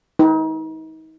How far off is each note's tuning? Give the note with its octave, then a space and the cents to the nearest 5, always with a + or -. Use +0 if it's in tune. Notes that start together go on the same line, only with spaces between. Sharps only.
D#4 +35 B4 +0